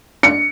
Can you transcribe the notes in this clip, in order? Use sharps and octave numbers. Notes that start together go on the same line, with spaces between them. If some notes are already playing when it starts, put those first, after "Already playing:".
C#7